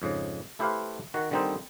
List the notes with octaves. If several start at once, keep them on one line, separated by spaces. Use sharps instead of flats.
F2 G#2 C#3
A3 E4 G4 B4 C5 F5
D#3 F#4
D3 D#3 G3 C4 D#4 C5